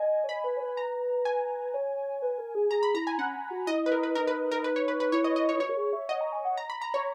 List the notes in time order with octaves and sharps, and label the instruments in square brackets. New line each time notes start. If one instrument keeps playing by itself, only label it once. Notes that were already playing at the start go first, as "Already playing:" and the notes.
Already playing: [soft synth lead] D#5 [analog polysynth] G#5
[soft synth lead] C#5
[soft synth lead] D#5 [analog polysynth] B5
[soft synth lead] B4
C#5
B4
[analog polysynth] A#5
G#5
[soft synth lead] C#5
B4
A#4
G#4
[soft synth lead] G#4 [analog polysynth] A#5
[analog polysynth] B5
[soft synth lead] E4 [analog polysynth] A#5
[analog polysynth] G#5
[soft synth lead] C#4 [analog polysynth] F#5
[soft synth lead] F#4
[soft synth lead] E4 [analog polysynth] D#5
[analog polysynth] B4
A#4
B4
[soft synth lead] D#4 [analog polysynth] A#4
[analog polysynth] B4
A#4
B4
C#5
B4
B4
[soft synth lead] E4 [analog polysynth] C#5
[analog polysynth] D#5
D#5
C#5
[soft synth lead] E4
[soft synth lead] F#4 [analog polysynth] C#5
[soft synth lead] A#4
G#4
E5
[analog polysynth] D#5 [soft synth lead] F#5
[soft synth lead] A#5
G#5
F#5
[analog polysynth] A#5
B5
A#5
C#5